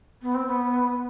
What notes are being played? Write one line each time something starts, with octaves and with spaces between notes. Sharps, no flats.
B3
C4
B3